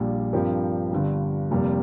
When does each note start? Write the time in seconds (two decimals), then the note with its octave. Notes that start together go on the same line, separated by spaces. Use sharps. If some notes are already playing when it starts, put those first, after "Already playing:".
Already playing: A#1 A#2 G3
0.33 G2 F3 C4 G4 A#4
0.91 G1 G2 G3
1.51 F1 F2 C3 G3 A#3